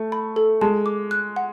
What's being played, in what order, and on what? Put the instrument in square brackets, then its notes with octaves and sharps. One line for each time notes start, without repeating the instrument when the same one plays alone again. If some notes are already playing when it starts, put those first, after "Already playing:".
Already playing: [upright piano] A3
[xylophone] B5
A4
[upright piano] G#3 [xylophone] A5
[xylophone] D6
F#6
F#5